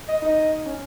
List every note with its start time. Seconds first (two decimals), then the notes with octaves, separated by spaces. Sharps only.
0.08 D#5
0.22 D#4 D#5
0.66 C#4